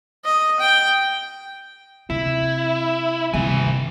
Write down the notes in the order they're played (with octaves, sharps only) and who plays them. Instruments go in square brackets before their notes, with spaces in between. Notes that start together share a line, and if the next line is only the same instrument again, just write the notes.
[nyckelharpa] D#5
G5
[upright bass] C3 [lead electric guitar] E4
[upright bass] G2 C3 [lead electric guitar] D#3 G#5